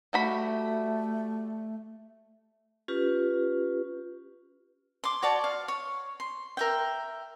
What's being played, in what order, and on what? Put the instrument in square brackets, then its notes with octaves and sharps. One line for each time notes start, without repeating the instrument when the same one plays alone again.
[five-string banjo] G3 F#4 B5 [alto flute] A3
[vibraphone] C#4 F4 G4 B4
[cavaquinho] C6 D6
F#4 C#5 D5 A5
F5
C#5
C6
A#4 E5 G5